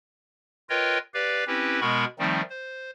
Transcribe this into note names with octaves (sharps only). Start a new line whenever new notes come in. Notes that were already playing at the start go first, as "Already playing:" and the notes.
F4 A#4 B4 C#5 D#5 G5
G4 B4 D5 F5
C4 C#4 E4 G4 B4
B2 G#3 B3 A#4 B5 C#6
D#3 F3 G3 A3 C4 D#4
C5